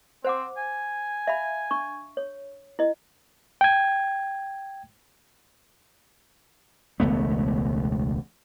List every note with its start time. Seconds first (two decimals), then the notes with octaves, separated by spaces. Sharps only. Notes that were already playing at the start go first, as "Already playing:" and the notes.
0.24 C4 C5 F#5 D6
0.57 G#5
1.27 E5 F5 B5
1.71 D4 C#6
2.17 C#5
2.79 E4 D#5
3.61 G5 G#6
7.00 E1 C#2 A3 B3